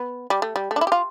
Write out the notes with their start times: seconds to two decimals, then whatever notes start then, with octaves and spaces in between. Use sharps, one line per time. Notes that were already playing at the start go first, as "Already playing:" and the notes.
Already playing: B3
0.30 G3
0.42 A3
0.56 G3
0.71 A3
0.76 D4
0.81 E4
0.87 G4
0.92 F4